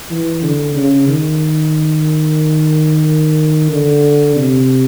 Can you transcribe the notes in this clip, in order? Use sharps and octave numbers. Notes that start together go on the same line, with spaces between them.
E3
D3
C#3
D#3
D3
C3